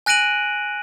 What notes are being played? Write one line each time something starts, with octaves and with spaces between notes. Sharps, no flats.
G#5 F#6 A#6 D7 D#7 F#7